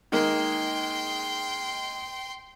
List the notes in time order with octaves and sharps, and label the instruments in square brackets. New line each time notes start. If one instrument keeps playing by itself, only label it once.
[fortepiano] D#3 G#3 A#3 [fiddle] G5 C6